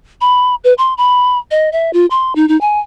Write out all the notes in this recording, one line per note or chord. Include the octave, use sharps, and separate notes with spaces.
B5
B4
C6
B5
D#5
E5
F4
C6
D#4
D#4
G#5